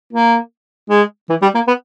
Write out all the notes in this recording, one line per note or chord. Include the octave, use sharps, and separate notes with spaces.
A#3
G#3
E3
G3
A#3
B3